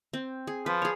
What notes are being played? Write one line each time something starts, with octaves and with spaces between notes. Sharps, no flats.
C4
G#4
F3 B4
G#4 C#5